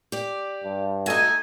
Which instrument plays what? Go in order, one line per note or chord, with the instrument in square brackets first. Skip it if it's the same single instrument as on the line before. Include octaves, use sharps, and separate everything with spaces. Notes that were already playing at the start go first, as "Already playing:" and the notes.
[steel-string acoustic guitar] G4 D5
[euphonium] G2
[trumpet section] A3 D#4 G#5 [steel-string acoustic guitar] F#4 A4 D#5